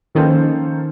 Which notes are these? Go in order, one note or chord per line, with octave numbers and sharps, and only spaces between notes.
D#3 F3 A#3 C#4 A4 C5